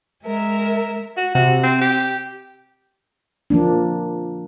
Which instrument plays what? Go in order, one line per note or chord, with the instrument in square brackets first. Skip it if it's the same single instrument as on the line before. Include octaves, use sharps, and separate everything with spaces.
[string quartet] G#3 A#4 E5
[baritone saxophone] F#4
[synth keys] C3 [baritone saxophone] F#4
[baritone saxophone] C4
G4
[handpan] F3 A#3 D4